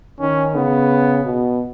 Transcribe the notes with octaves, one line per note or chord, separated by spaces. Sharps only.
D#3 C#4
C#3 B3
B2